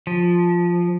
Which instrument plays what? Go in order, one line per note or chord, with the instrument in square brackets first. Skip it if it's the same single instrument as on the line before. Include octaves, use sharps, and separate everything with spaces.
[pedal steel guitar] F3